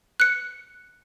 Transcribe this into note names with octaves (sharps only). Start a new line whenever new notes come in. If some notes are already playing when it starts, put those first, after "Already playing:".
F#6 C#7